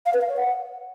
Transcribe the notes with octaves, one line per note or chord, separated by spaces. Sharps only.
F5
B4
F5
C#5
F#5